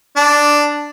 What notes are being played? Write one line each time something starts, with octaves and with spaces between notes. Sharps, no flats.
D4